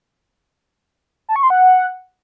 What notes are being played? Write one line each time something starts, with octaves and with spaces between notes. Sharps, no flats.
A5
C#6
C6
F#5